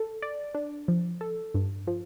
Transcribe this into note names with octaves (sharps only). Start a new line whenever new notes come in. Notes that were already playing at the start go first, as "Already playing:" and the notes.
Already playing: A4
D5
D4
F3
A4
G2
F3